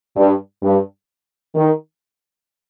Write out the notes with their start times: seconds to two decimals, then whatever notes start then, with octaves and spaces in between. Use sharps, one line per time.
0.17 G2
0.63 G2
1.55 D#3